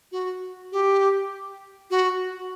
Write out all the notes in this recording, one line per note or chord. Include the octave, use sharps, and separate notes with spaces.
F#4
G4
F#4